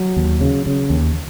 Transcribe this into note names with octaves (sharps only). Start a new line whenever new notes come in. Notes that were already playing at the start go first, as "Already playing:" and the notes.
Already playing: F#3
D#2
C#3
C#3
D#2